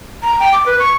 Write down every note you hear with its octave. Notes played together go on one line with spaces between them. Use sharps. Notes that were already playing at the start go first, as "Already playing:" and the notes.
A#5
G5
D6
B4
C#6